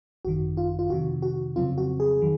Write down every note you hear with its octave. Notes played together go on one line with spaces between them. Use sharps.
G#1 F#2 D#3 F#4
F4
F4
F2 C3 D#3 F#4
F#4
F2 C#3 F#3 C4 F4
F#4
G#4
D#3 F#3